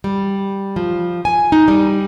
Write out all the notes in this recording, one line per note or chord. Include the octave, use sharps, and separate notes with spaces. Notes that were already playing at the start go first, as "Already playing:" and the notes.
G3
F3
G#5
D#4
G3